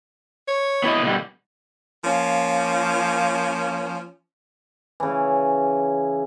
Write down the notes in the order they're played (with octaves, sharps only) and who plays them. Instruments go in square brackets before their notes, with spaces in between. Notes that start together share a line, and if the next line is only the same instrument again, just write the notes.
[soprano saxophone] C#5
[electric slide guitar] B3 E4 D#5
B2 D3 G3
[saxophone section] F3 A#3 C#4
[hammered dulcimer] C#3 E3